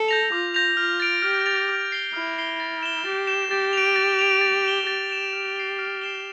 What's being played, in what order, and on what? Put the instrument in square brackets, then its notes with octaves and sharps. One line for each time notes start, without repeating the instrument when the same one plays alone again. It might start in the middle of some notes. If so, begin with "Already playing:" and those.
Already playing: [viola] A4
[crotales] G6 A#6 F7
[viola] F4 [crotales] D6
[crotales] G6 A#6 F7
[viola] F4 [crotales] F6
[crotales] A6 D7 F7
[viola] G4 [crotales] F6
[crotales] A6 D7 F7
F6
A6 C7 G7
[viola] E4 [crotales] F6
[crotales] A6 C7 G7
A6
E7 G7
[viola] G4 [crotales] A6
[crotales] E7 G7
[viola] G4 [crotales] A6
[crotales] D7 F7
A6
D7 F7
A6
E7 G7
[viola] G4 [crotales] A6
[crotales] E7 G7
F6
C7 E7 G7
F6
C7 E7 G7